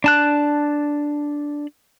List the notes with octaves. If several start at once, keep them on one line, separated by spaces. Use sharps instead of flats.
D4 A5 F#6